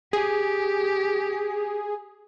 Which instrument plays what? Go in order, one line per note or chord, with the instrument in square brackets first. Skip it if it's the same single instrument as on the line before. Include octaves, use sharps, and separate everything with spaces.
[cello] G4 [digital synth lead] G#4